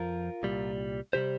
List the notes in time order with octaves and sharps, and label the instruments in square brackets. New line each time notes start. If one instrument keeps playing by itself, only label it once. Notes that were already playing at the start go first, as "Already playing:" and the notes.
Already playing: [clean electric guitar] F2 F3 F4 A#4
C2 A#2 G3
C3 G3 G4 C5